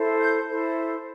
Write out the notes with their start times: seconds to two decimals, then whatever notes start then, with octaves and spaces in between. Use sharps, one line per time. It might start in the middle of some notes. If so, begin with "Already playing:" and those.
Already playing: E4 A4 C5
0.21 G6
0.48 E4 A4 C5